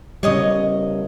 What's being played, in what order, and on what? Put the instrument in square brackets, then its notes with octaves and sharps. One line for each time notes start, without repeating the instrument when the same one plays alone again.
[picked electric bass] C#3 G3 [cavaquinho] C#5 D#5 D#6